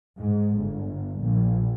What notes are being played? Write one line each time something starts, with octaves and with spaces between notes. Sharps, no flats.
G#2
G1
A#1